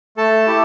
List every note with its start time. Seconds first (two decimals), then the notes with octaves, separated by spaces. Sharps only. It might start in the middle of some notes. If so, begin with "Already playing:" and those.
0.17 A3 A4 A5
0.47 E4 G4